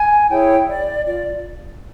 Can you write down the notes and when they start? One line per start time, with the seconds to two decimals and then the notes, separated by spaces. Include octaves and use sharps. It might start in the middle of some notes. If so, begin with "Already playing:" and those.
Already playing: G#5
0.30 E4 G#4 C#5 G5
0.67 D5
1.05 F4 D5